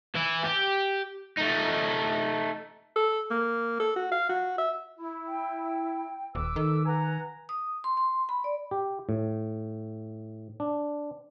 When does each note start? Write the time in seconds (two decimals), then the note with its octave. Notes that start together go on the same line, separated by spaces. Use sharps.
0.15 E3 E4
0.44 G4
1.37 A3 D#4
2.96 A4
3.30 A#3
3.80 A4
3.96 F#4
4.12 F5
4.29 F#4
4.58 E5
4.99 E4
5.27 G5
6.35 D#1 B4 D6 E6
6.56 D#3 A4
6.86 B4 F#5 G#5 A#5
7.49 D#6
7.84 C6
7.97 C6
8.29 B5
8.44 D5
8.71 G4
9.09 A2
10.60 D4